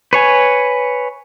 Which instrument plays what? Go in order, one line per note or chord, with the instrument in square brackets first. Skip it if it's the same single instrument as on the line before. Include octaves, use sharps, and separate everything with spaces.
[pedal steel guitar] B4 C#5 G#5